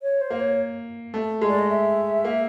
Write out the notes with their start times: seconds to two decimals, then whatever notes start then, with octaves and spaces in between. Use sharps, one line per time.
0.02 C#5
0.21 C5
0.30 A#3
0.40 C#5
1.14 A3
1.41 G#3
1.49 D5
1.59 D#5
1.69 E5
2.24 A#3